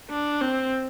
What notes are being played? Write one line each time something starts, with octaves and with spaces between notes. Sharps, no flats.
D4
C4